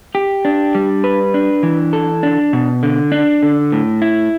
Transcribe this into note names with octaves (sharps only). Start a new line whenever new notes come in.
G4
D4
G3
B4
D4
E3
A4
D4
B2
D3
D4
D3
A2
E4